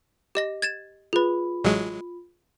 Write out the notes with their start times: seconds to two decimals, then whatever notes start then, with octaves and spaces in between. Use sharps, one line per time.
0.35 G4 D#5 A#6
0.62 G#6 A6 E7
1.13 F4 G#4 B4 B5
1.64 A1 F#3 G#3